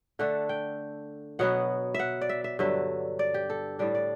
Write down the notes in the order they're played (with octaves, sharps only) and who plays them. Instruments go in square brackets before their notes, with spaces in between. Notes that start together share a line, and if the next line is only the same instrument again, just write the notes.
[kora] D3 A3 D4 F#5
G5
B2 F#3 B3 F#5
E5 F#5
D5
E5
E5
G2 D3 F#3 E5
D5
G4
A4
A2 G3 D4 D5
D5